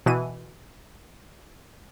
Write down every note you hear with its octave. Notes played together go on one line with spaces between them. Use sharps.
B2 E3 D#7